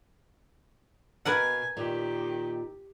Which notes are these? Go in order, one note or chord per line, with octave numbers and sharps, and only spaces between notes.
B2 A#4 B4 F5 F#5 G#5
A#2 D#3 G4